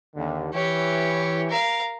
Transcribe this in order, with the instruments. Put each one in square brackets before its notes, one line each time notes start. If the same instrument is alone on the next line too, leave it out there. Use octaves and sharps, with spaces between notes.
[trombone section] D#2 D3
[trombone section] E3 [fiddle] G4 C#5
[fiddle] A#4 F5